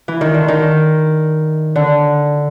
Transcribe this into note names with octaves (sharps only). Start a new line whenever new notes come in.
E3
D#3
D3
D#3
D3